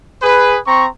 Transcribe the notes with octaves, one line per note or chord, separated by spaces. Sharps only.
G#4 B4
C4 A#5 C#6